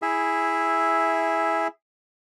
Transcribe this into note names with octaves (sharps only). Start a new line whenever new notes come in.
E4 G#4 E5